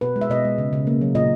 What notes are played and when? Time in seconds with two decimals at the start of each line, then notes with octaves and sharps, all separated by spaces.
0.01 B2 B4
0.16 G#3
0.21 E5
0.30 B2 D#5
0.45 G#3
0.58 C#3
0.73 C#3
0.87 A#3
1.01 F#3
1.15 A#2 D#5